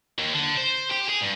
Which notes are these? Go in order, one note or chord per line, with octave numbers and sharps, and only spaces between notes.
D#2
D3
C5
G4
G#4
G2